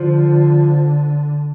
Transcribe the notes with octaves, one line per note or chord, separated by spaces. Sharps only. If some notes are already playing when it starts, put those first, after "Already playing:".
Already playing: D3 F3